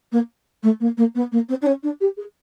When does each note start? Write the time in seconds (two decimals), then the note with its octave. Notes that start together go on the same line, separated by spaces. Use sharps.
0.12 A#3
0.63 A3
0.80 A#3
0.97 A#3
1.15 B3
1.31 A#3
1.48 C4
1.62 D4
1.66 C#4
1.83 D4
2.00 G4
2.17 G#4